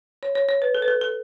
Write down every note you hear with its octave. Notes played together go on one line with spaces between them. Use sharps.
C#5
C#5
C#5
B4
A4
B4
A4
A4